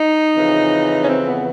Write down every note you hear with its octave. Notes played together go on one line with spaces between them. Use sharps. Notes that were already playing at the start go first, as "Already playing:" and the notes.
Already playing: D#4
F2 C#3 E3
C#4
C4
B3